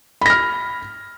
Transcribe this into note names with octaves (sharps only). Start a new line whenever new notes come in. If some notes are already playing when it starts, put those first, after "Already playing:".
B5 F6 A#6